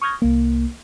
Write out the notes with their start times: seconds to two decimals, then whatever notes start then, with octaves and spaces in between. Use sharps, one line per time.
0.02 C#6 D#6 F6 G6 G#6 A#6
0.22 C2 A#3